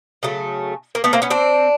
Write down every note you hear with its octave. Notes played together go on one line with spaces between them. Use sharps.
C#3 F#3 A3
A#3
A3 B3
A#3 C4
B3 C#4
C4 D4